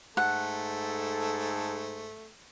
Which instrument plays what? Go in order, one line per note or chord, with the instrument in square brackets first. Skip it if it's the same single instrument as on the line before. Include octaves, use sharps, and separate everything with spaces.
[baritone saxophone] G#2 [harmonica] A3 [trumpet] A4 [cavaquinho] F#5